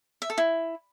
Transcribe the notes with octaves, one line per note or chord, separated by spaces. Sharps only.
E5
A4
E4